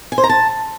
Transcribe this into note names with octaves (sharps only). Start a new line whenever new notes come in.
G#5
C5
A#5
A5